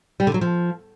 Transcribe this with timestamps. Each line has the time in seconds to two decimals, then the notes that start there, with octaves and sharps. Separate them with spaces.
0.20 G3
0.27 D3
0.34 F#3
0.41 F3